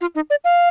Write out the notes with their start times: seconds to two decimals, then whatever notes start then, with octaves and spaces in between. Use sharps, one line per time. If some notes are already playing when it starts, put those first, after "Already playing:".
0.01 F4
0.15 D#4
0.30 D5
0.44 F5